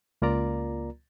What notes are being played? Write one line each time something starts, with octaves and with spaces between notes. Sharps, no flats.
C#2 A#3 F4 A#4 D5 A#5